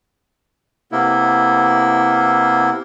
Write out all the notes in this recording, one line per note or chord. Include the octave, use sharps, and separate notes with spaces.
C3 A#3 B3 E4